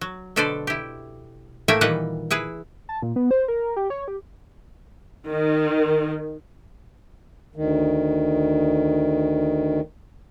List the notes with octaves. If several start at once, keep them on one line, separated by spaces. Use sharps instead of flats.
F#3
B2 D3 A4 B4 C5 D5
E4 G4
A2 A3 A#3 E5 G5 G#5
A#2 D#3 E3 G3 B4 F#5
E4 G#4 B4
A5
A#2
B3
C5
A#4
G4
C#5
G4
D#3
D2 D#3